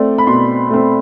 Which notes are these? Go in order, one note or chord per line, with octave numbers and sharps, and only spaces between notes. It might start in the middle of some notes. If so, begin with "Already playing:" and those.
Already playing: A3 C4 D5
B5
B2 C6
A3 C4